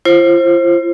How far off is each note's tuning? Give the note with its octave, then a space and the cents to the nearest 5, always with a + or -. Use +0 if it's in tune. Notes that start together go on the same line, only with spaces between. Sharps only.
F4 -40 C5 +20